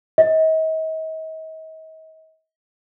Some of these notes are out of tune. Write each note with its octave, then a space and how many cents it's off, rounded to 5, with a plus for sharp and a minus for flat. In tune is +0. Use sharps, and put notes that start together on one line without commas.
D#5 +40